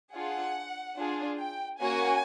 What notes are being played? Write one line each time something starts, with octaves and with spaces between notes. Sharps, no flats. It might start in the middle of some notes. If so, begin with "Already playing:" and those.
D4 F4 G#4 F#5
D4 F4 G#4
G5
A#3 C#4 F#4 G#5